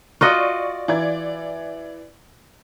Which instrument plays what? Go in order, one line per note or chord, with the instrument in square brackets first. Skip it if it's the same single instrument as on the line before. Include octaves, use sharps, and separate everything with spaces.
[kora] F4 F#4 D#5 [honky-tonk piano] D5 C#6
[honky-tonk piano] E3 D5 G#6